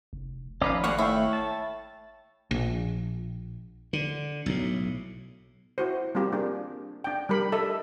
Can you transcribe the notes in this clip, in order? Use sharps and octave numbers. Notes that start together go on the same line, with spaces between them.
F1
G#1 F3 C#4 D#4 B4 D5 F5
G3 A3 A#3 G#4 F5 F#5 C#6
E4 C#5 G5
A5
A#1
D3
B1 A2
E4 F#4 C5
G3 A#3 C4 F4 G4
A#3 D4 G#4
D4 G5
G3 G4 A#4 B5
A4 D#5 E5